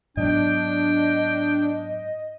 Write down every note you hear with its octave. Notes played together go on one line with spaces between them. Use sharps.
G#2 F#3 B3 D4 D#5 G5